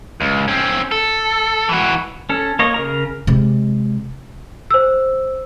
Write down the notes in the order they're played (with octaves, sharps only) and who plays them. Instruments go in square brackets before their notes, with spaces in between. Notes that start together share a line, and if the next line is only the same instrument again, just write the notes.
[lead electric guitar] C#2
C4 C#4
A4
E3 F#4
[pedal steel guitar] C#4 A4
A#3 C#5 D#5
C#3 A#4 A#5
[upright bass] C3 G#3
[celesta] C5 E6